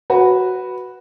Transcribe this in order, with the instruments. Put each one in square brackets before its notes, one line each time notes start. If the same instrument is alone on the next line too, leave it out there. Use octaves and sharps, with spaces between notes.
[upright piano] F#4 B4